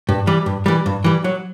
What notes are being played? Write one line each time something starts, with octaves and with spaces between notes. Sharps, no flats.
G2
E3 G3
G2
E3 G3
G2
E3 G3
F#3